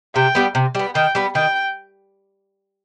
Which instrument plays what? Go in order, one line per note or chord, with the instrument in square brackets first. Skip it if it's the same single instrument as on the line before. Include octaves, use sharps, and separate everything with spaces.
[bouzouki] C3 [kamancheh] G5
[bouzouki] G3 B3
C3
G3 B3
[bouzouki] D#3 [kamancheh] G5
[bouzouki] G3 B3
[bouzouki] D#3 [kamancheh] G5